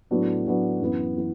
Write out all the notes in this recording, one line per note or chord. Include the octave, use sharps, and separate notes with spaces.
A2 F#3 B3 D4 F#4
A2 F#3 B3 D4 F#4
F#2 E3 B3
E3